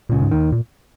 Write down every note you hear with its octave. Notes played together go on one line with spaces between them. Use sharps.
C#2 A#2 C#3
G#2
D#2 D#3
A#2